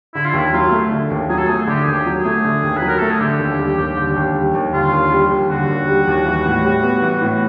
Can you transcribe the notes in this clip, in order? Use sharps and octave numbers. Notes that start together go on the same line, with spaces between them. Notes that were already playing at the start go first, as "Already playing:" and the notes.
D3 E4
F4
D#2 E4
F#3 F4
A3
D3
D#2
F#3 G#4
A4
A3 G#4
D3 G4
D#2 G#4
G4
F#3
G#4
A3
D3
D#2
F#3 B4
A#4
A3 A4
G#4
D3 G4
D#2
G3
D#2
D3
D#2
G3
D#2
D3 F4
D#2
G3
D#2
D3 F#4
D#2
G3
D#2
E3
A2
G3
B3
E3
A2